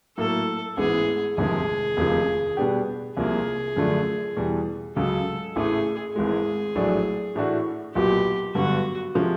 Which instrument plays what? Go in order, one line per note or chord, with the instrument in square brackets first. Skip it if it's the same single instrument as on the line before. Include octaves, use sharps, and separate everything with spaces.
[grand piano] A2 F#3 A#3 [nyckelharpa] A4
[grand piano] A1 G#2 E3 G#3 B3 [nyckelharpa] G#4
[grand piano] G1 F2 C3 D#3 G#3 [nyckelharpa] G#4
[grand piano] F1 D#2 C#3 F3
B2 G3 B3 D4 G4
[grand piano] C2 C3 F3 A#3 [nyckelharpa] G#4
[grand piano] F#2 D3 F3 A3 D4
E2 B2 G3
[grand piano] C#2 C#3 F#3 [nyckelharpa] A4
[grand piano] A1 A2 E3 A3 [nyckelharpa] G#4
[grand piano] G#1 G#2 E3 G#3 [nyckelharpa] G#4
[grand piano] A#1 A2 F#3 A3 D4
A2 E3 A3 D4 F#4
[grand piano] B1 A#2 F#3 B3 [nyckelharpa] G4
[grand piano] G2 D3 F#3 B3 [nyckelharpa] F#4
[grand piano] C3 F3 G#3 C#4